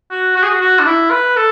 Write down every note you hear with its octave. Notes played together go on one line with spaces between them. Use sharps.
F#4
F#4
G#4
F#4
F#4
D4
E4
B4
A4